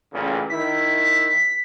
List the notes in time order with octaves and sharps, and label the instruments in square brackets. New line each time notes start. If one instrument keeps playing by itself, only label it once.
[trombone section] A1 A#2 C#3
[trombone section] D#3 E4 [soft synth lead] B6